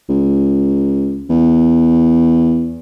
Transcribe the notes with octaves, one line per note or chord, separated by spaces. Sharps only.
C#2
E2